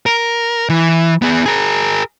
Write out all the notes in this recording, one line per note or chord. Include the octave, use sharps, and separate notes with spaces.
A#4
E3
B3 G#4
G#4 A#4